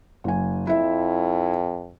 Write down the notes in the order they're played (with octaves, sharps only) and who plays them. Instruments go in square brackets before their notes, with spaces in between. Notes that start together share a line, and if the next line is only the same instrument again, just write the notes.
[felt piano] F#1 G#5
[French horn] F2 [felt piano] E4 E5